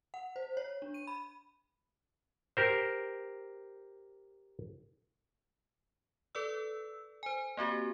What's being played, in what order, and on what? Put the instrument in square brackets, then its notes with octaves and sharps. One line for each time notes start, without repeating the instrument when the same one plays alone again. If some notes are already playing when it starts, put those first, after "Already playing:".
[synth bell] F#5
C5
C#5
D4
D#7
B5
[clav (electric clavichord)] G4 A#4 C5
[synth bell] A4 B4 D5 E6
C5 G#5
A#3 C4 F#4 G4